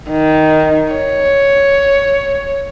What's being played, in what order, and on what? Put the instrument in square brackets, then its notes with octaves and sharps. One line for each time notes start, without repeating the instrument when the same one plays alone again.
[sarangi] D#3
C#5